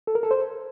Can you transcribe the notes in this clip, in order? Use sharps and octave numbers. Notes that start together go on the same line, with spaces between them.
A4
A#4
A4
C5